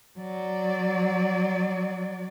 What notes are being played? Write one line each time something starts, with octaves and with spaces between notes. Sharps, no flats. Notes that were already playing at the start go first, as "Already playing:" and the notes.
F#3 D5